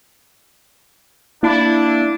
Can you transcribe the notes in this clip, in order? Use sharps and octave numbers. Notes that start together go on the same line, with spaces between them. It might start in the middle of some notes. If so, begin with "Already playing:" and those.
A#3 D4 E4